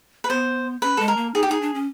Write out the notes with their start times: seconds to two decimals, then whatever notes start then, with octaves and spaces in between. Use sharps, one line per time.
0.24 B4
0.29 B3 C5
0.82 C#4 B4
0.97 G#3 A4
1.08 A#4
1.17 A#3
1.34 D#4 G#4
1.43 G4
1.48 D#4 G#4
1.62 D4
1.74 C#4